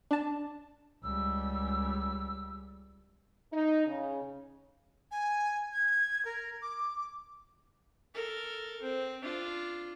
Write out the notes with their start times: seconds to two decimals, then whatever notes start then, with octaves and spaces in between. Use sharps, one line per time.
0.11 D4 A5
1.03 C#2 G3 E6
3.51 D#4
3.86 C#3
5.11 G#5
5.73 G#6
6.25 A#4
6.62 D6
8.14 A4 A#4
8.82 C4
9.23 D4 F4